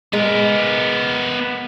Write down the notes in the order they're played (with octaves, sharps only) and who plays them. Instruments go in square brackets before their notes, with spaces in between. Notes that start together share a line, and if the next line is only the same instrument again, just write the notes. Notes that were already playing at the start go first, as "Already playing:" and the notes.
[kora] G#3 [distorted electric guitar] B3 A#4